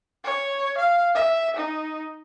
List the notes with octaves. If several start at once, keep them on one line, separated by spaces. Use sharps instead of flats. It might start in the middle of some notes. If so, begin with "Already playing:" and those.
C#5
F5
E5
D#4